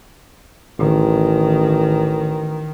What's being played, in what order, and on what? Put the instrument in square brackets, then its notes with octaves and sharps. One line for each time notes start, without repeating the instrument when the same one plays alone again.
[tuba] A1 [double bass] D#3